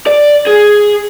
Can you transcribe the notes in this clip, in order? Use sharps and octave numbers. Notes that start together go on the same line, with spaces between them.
D5
G#4